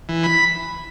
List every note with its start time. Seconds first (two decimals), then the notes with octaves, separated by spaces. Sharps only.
0.09 E3
0.24 B5